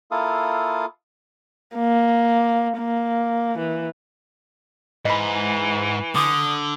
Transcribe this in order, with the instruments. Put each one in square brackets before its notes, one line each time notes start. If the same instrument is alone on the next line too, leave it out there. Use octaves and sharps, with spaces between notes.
[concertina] A#3 E4 F4 A4 F5 D#6
[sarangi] A#3
A#3
E3
[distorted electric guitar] G#2 [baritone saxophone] E3 [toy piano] D#5 B5
[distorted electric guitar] D3 [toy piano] C6 D6 [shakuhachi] D#6